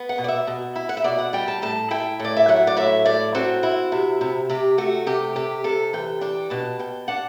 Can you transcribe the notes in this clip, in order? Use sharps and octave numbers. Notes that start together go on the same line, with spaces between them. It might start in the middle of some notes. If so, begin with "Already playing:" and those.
Already playing: B3
F#5
B2
D5
E5
B2
E4
F#5
E5
B2 D5
F#5
G3 G5
A5
A2 A5
E4 G5
A2
D5
E5
F#3 F#5
D5
A2 E5
A2 D5
C4 F#4
E4
C3
C3
C3 G4
A3 F#4
C3 G4
C3 G4
C3 A4
E3 G5
D4 G5
B2 A5
B2 G5
D4 F#5